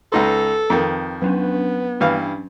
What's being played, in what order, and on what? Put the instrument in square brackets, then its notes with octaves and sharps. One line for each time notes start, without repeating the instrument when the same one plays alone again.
[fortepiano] C#2 D#4 C6 [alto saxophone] A4 [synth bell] B4
[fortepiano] F2 D#3
[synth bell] F#3 C#4 D4 [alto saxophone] B3
[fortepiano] G2 E3 F5